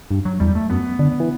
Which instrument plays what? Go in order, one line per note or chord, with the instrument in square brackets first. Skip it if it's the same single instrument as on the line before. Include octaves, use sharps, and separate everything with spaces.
[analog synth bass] G2
[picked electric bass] F#3
[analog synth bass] E2 [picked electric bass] G3
[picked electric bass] A3
[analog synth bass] F#2 [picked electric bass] B3
[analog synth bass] D3
E3